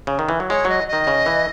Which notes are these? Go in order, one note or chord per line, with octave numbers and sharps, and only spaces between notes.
C#3
D#3
E3
F#3
G#3 C#5
F#3 D#5
D#3 D#5
C#3
E3